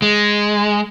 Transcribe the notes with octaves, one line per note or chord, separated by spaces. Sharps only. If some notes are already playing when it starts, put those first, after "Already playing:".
G#3